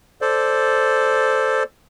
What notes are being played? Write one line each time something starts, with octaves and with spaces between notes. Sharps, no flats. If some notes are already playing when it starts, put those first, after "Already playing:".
A4 C5 D5